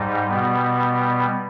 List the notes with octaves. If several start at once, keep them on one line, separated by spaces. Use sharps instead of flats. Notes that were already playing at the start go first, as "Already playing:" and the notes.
Already playing: G#2 G3 D#4
B2 G3 B3